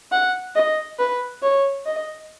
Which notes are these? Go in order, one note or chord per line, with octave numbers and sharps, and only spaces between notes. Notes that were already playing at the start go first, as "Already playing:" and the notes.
F#5
D#5
B4
C#5
D#5